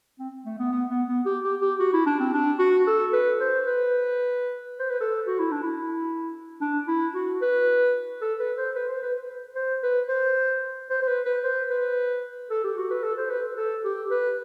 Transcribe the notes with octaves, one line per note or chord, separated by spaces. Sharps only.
C4
A3
B3
B3
B3
B3
G4
G4
G4
F#4
E4
D4
C4
D4
F#4
A4
B4
C5
B4
C5
B4
A4
F#4
E4
D4
E4
D4
E4
F#4
B4
A4
B4
C5
B4
C5
B4
C5
B4
C5
C5
C5
B4
B4
C5
B4
A4
G4
F#4
B4
A4
C5
B4
A4
G4
B4